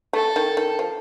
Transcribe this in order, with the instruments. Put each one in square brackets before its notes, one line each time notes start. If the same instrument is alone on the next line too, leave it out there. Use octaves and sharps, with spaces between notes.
[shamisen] A3 [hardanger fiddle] A4
[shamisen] D#3
D#3
F3